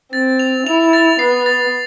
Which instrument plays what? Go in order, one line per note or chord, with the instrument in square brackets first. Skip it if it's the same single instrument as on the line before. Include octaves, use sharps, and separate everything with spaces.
[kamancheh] C4 [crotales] A6
[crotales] F7
[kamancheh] E4 [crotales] F7
[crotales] A6
[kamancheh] B3 [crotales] C7
[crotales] A6